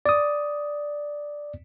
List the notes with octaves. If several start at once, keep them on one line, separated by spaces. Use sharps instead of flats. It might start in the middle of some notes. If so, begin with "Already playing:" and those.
D5 D#6